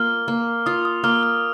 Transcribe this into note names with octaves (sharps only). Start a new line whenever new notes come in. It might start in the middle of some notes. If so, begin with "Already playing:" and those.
Already playing: A#3 F4 F6
A#3
F4 D#6
D#6
A#3 F6
F6